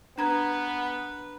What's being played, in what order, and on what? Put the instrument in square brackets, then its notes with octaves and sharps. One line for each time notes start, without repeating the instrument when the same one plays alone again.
[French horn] B3 [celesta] D4 A#5 G#6 [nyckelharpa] B4